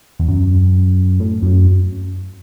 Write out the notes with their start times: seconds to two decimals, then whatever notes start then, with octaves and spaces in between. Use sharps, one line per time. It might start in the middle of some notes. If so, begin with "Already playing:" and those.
0.19 E2
0.28 F#2
1.20 A2
1.43 F#2